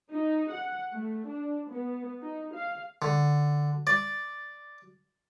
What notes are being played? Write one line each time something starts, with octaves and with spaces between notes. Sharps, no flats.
D#4
F#5
A3
D4
B3
D#4
F5
D3
D5